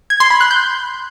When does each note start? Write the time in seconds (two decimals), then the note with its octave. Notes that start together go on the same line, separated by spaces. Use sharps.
0.10 G#6
0.20 C6
0.30 B5
0.41 F#6
0.51 G6